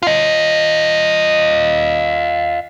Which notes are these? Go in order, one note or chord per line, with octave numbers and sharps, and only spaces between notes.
F4 D#5